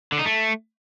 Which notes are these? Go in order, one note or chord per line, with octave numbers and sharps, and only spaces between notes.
D3
D#4
A3